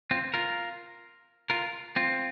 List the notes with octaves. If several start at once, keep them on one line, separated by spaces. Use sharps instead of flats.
C4 F4
F4 A#4
F4 A#4
C4 F4